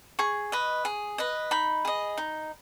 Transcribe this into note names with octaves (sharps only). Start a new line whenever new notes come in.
G#4 C#6
B4 D#5
G#4
B4 D#5
D#4 B5
G#4 D#5
D#4